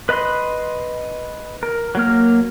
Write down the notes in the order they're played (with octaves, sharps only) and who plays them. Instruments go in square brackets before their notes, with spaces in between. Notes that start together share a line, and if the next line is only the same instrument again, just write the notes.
[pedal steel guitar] B4 D#5 B5 C6
A#4
F#3 A#3 F6